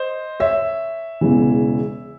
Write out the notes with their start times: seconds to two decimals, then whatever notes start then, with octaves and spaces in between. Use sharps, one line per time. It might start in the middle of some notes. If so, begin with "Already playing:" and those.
Already playing: C5 D#5
0.40 C#5 E5
1.21 E1 E2 C#3 E3